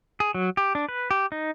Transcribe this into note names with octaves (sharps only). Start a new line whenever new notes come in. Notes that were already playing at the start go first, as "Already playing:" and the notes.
G#4
F#3
G4
D4
B4
G4
D#4